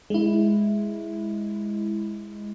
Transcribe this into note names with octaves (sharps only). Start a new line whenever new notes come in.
G#3 E4